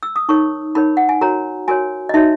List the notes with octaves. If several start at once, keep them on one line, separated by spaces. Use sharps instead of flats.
E6
D#6
D#4 A#4 C#5 C#6
D#4 A#4 C#5 B5
F#5
G#5
F#4 A#4 C#5 A#5
F#4 A#4 C#5 G#5
D#5
D#4 F#4 C#5 E5